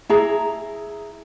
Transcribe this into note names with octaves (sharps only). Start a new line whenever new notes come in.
E4 G#4 A#5